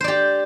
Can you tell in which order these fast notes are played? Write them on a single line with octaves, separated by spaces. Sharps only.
C5 D5 G4